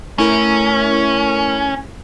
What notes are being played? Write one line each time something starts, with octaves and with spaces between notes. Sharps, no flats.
A3 C#4 E4 A#4